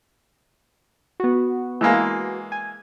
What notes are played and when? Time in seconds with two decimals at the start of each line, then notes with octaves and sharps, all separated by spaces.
1.20 B3 F#4
1.81 E3 G#3 A#3
2.52 G#5